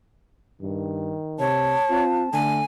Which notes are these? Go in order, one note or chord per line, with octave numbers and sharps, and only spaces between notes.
G2 D#3
C3 C#5 A5
C4 F4
D3 A3 G#5